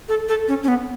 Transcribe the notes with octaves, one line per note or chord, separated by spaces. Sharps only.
A4
A4
C#4
C#4
B3